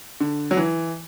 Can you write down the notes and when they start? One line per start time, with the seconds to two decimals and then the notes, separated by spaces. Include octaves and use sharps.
0.20 D3
0.51 F#3
0.57 E3